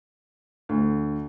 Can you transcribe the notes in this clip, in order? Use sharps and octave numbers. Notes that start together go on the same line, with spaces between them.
D2